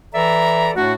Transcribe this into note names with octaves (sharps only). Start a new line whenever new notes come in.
E3 A4 D5 E5 A#5
A2 A3 D4 F#4